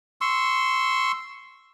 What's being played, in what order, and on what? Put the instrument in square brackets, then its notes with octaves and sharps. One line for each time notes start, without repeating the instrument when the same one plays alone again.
[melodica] C6 C#6 E6